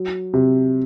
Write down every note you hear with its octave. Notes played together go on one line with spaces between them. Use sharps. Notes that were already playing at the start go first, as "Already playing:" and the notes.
Already playing: F#3
C3